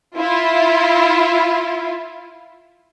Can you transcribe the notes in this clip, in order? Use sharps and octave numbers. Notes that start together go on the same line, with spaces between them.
E4 F4